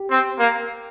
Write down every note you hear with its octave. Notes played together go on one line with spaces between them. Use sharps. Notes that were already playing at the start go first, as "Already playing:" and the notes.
Already playing: G4
C4
A#3